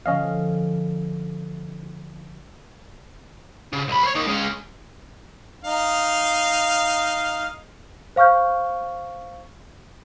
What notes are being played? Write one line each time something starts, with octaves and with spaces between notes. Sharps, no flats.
D3 F3 C#4 D#5 F5
C#3
C2 B5
C5 C#5
A#3 D#4
G#3 C#4
D#4 F5
C5 F5 C#6 F6 G6